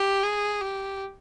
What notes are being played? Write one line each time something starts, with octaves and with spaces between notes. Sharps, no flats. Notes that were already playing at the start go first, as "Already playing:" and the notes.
Already playing: G4
G#4
G4